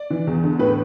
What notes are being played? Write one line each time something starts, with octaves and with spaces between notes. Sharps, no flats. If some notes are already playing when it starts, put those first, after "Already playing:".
Already playing: D5
E3
E2
D3
A2 B4